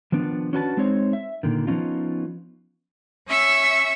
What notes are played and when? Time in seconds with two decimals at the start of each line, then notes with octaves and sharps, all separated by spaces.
0.12 D#3 F3 B3 D4
0.53 C#4 D4 F#4 B4 G5 A5
0.77 G#3 C4 D#4 C5 C#5
1.13 E5
1.43 A#2 D3 D#3
1.67 F3 B3 C#4 D#4 F4
3.27 C#4 E5 C#6 E6